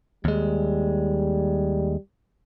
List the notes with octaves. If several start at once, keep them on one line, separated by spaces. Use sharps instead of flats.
D#2 G3 G#3